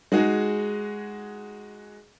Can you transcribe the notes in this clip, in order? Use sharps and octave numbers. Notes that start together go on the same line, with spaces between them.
G#3 D#4 F#4 G#4